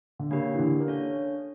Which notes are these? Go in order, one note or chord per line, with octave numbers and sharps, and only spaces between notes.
D3
C#3 A#3 D4 G4 A#4
E3
D3
A#3
C#4 D4 A4 C#5 F5